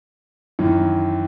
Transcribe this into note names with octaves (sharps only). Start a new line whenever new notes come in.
F#2 D#3 E3